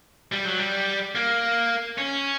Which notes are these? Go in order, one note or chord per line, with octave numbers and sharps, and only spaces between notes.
G3
F#3
G3
A#3
C#4